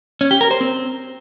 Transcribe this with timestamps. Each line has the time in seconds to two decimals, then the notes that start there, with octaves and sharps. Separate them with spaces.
0.21 C#4
0.31 G4
0.41 A#4
0.51 C5
0.61 C4